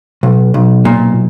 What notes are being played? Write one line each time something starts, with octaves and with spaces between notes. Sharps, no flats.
B1
B1
A#2